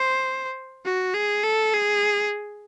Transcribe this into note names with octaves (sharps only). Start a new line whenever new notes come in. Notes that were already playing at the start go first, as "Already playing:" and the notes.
Already playing: C5
F#4
G#4
A4
G#4